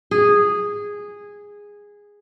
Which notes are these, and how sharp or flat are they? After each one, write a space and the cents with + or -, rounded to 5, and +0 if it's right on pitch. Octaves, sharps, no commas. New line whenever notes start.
G#4 -10